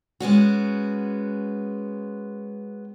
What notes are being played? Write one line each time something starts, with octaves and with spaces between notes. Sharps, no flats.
G#3 B3 C#4 F#4